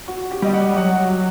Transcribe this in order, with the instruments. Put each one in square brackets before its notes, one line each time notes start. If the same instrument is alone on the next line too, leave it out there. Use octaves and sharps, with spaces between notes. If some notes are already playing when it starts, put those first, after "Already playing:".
[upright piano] F#4
G4
[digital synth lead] G3 [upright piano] D#5
[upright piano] F#5
[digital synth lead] F#3 [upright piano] F#5